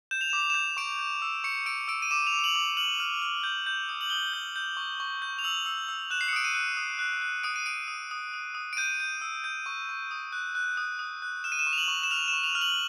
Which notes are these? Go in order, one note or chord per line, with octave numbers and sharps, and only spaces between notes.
G6 E7
F7
D6 E7
F7
G6 E7
C#6 D7
G6
E6
C#6 C#7
E6 D7
E6 D7
D#7
D6 E7
F7
D6
F7
F#7
D6
F6 F#7
F6
F6
G6
G6
D#6
F#7
D#6 G7
G6
G6
C#6
C#6
G6
F7
E6 F#7
E6
E6
F#6 E7
C7
C#7
D#6 D7
D#7
F#6
D#6
F#6
F#6
D#6 D7
D#7
D#6 D7
D#6
D#6
D#6
D#6
D7
G6 D#7
G6
E6
G6
C#6
C#6
D#6
F#6
F#6
D#6
D#6
F#6
F6 E7
D#7
E7
C#6
F7
F#7
C#6
E7
F6 F7
E7
C#6
F7
F6
F#7